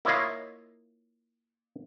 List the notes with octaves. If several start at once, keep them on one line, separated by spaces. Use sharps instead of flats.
A#3 E4 F4 C#5 D#5 F5